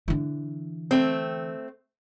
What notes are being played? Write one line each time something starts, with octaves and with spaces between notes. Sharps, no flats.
D3 E3
A3 C4